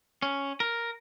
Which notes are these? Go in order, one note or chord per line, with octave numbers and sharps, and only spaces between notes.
C#4
A#4